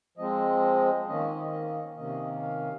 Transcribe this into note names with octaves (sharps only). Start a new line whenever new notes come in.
F3 G#3 C4 D#5
D#3 A#3 C#4 D#5
D#5
C3 D#3 A#3 C#4 D#5
F5